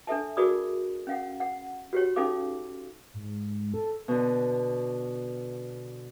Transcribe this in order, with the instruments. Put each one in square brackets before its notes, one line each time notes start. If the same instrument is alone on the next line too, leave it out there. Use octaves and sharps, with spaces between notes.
[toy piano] D4 A4 E5 A5
F#4 G#4 A#4 D5 B5 D#6
C#4 F5 F#5
F#5
F#4 G4 C#5
C#4 D#4 A4 F5 D6
[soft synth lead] G#2
A4
[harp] B2 D3